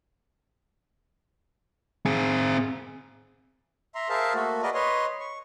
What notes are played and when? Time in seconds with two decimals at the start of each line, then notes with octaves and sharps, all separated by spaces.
2.06 C4 G#4
3.95 E5 A#5 C6
4.09 G#4 A#4 C5 E5 F5 A5
4.34 A3 A#3 F#4
4.63 F#4 G#4 A#4 B4 D5 D#5
4.74 B4 C#5 D#5 C6
5.20 C#6